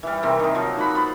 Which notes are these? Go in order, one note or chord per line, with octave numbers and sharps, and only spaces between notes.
E3 G3
C3 E3 A#3 C4
D#3 D#4
F3 F#3
D#4 F#4 F#5 B5
F4 C5 B5